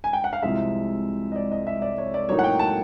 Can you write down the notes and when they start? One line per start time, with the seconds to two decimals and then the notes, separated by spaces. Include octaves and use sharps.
0.04 G#5
0.13 G5
0.24 F#5
0.33 F5
0.42 C2 C3 F3 G#3 E5
1.32 D#5
1.36 D5
1.51 D#5
1.67 E5
1.82 D5
1.98 C#5
2.14 D5
2.29 A2 F#3 A#3 D#4 C#5
2.39 F#5
2.44 G5
2.59 A5